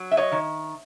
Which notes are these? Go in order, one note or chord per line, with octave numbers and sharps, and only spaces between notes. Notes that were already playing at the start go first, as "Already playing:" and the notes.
Already playing: F#3
E5
C#5 D#5
D#3